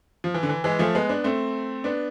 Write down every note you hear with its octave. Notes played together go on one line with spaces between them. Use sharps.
F3
E3
D3
E3
E3 G#3
F3 A3
G#3 B3
B3 D4
A3 C4
B3 D4